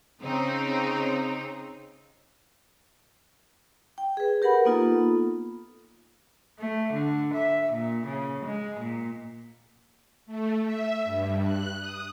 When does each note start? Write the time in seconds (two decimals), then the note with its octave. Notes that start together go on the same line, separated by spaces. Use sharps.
0.22 C#3 C4 D#4
3.98 G5
4.17 G#4 B4
4.42 G4 A#4 B4 F#5 B5
4.65 A#3 B3 D#4 F4 A4
6.59 A3
6.93 D3
7.34 E5
7.73 A#2
8.07 C#3
8.45 G#3
8.81 A#2
10.26 A3
10.62 E5
11.04 G2
11.43 F#6
11.80 D#6